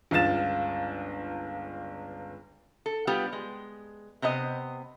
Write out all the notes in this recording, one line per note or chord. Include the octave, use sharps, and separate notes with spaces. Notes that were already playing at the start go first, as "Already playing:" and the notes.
G1 C#2 F5 A6 E7
A4
G3 B3 F4 G4
G#3
C3 B3 C5 D#5